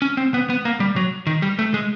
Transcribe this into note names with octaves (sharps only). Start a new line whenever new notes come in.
C#4
C4
B3
B3
A#3
G3
F#3
D#3
G3
A3
G#3